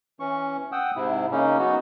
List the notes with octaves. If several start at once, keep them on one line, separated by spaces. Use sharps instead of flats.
E3 C#4 C#6
F#5 G5 D#6 E6
G#2 C3 E4
C#3 A#3 C#4 D#4
F#3 B3 D#4 F#4